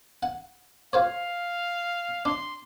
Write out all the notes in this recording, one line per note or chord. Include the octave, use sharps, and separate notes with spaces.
F#5
F4 C5 C#5 F5
D4 C6